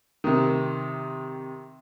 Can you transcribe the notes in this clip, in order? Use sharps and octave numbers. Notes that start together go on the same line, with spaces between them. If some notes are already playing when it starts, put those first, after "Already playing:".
C3 D#3